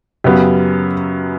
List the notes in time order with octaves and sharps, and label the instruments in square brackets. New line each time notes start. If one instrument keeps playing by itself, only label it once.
[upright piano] F#2 C#3 F#3 B3 G4